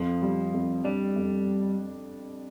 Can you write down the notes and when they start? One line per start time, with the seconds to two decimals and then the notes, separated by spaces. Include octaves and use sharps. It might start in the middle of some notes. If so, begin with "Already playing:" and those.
Already playing: F2 F3
0.22 G3
0.54 F2
0.84 G3 D4
1.16 F2